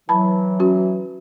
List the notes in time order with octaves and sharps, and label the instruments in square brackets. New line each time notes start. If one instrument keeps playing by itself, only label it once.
[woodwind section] E3 F#3 [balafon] A5 B5
[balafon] C#4 F#4